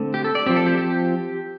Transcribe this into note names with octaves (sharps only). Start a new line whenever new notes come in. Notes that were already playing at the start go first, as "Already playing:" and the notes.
Already playing: D3 A3 C4
G4
A4
D5
F3 C4 G4
A4
G4
G4